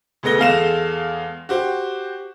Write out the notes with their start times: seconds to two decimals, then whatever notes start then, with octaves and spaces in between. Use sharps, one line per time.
0.23 D2 G#3 B3 A#6 G7
0.38 E2 G#3 A4 F5 A#6 E7
1.49 F#4 G4 C5